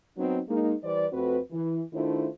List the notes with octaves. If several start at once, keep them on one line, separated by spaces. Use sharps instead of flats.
F#3 B3 C4 D#4
G#3 A#3 D#4
E3 G3 B4 C5 D5
F2 A3 C4 F#4 B4
E3
D#3 A3 D4 E4 F4 C5